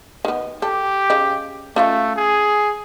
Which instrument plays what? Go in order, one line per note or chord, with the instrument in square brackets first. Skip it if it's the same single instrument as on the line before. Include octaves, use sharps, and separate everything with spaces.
[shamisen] D#3 B3
[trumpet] G4 [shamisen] A4
[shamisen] C#3 D#4
[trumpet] A3 [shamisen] C#4 F4 F5
[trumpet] G#4